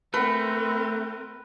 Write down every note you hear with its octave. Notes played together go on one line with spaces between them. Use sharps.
A3 C4 A#4 B4